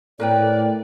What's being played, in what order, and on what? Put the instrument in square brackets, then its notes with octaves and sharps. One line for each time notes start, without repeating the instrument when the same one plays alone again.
[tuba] A2 [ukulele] A#4 B4 G5 [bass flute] D5